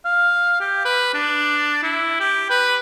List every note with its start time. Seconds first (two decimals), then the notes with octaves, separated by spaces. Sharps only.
0.05 F5
0.60 G4
0.85 B4
1.14 D4
1.83 E4
2.20 G4
2.50 B4